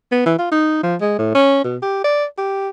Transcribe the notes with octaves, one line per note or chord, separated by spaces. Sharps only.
B3
E3
F4
D#4
F3
G#3
A2
C#4
B2
G4
D5
G4